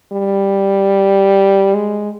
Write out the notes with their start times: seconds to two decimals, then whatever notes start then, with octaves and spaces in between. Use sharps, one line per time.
0.13 G3
1.74 G#3